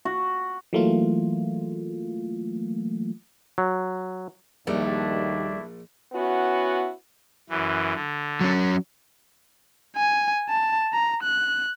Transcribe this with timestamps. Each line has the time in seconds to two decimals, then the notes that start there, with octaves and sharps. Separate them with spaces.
0.05 F#4
0.73 E3 F#3 A3 A#3 F4
3.58 F#3
4.67 A#1 D#2 G3 A3 D4 E4
6.14 B3 C#4 E4 F#4
7.50 F#2 E3
7.94 D3
8.41 F#3 C#4
9.96 G#5
10.49 A5
10.93 A#5
11.23 F#6